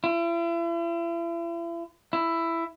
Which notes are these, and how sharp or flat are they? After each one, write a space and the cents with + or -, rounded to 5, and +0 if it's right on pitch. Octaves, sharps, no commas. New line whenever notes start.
E4 +40
E4 +10